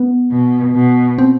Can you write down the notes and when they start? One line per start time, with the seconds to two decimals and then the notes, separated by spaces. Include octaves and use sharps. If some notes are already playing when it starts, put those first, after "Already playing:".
Already playing: B3
0.31 B2
0.75 B2
1.18 C4